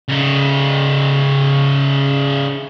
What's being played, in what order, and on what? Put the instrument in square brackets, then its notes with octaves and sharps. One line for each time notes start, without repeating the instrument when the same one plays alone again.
[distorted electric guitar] C#3 D#4